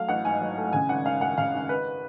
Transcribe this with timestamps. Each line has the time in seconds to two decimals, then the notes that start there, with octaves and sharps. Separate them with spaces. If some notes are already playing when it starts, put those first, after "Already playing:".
Already playing: F#3 A3 F5
0.08 A1 F#5
0.25 G#2 G#5
0.41 F#3
0.57 A3
0.73 C#3 G#5
0.89 G#1 F#5
1.06 G#1 F5
1.21 F#2 F#5
1.38 C#3 F5
1.53 G#1
1.69 G#3 B4